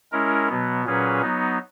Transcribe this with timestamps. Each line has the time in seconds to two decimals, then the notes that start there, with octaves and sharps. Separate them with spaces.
0.12 G#3 C#4 E4 A#4
0.48 B2 F#3 B3
0.85 A#2 F#3 C#4 G#4 B4
1.22 F#3 B3 D#4